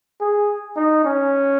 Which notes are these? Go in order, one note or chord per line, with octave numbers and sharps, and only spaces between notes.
G#4
D#4
C#4